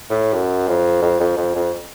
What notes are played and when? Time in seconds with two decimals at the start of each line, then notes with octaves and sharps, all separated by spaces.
0.10 A2
0.34 F#2
0.67 F2
1.02 F2
1.20 F2
1.37 F2
1.55 F2